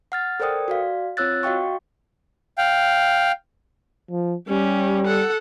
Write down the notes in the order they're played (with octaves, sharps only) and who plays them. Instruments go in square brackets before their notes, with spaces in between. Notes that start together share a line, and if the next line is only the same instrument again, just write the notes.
[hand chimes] F#5 F6 A6
A4 A#4 C5 D5 G5 D#6
F#4 D5 F5
C4 F4 C#5 E6 F#6 A6
F#4 D#5 F5 G5 C#6
[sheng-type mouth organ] F5 G5
[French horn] F3
[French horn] G3 [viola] C#4 G4
[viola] A4 F#5